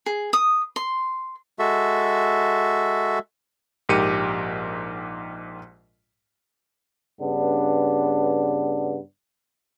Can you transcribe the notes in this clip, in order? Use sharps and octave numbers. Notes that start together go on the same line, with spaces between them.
G#4
D#6
C6
G#3 F#4 A4 E5
A#1 G#2 G4 A#4 C#7 D#7
G2 C#3 B3 D4